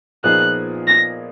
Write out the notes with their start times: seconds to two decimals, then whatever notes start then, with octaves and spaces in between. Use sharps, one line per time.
0.24 A#2 F3 B3 D#4 G#4 F#6
0.87 A#6